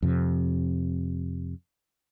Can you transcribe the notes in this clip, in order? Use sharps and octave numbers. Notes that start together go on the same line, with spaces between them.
F2 C3